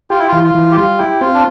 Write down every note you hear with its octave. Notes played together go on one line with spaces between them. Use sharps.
F4 G4
E4
E3 F4
F4
E3
G4
G3 F4
E4 G4
C4 F4
D4